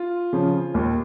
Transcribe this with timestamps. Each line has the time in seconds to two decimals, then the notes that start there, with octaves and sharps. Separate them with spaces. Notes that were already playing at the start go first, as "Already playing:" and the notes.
Already playing: F4
0.33 C#3 F3
0.74 D#2